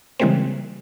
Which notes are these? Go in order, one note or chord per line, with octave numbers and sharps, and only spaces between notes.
C#3 E3 G3 G#3 A#3 C4